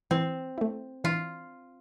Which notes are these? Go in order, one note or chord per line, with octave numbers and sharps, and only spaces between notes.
E3 C4
A3 E4
E3 F4